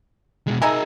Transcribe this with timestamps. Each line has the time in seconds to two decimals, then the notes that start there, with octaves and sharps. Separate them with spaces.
0.47 B2 G#3
0.62 D#4 G#4 A#4 E5 G#5